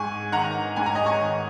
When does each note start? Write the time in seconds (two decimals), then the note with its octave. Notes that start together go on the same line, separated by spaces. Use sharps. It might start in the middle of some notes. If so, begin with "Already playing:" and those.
Already playing: G#2 G#5 C#6
0.32 D#3 F#5 A#5
0.76 G#2 G#5
0.86 A#5
0.95 D#5 G#5
1.06 G#5 C#6
1.21 D#3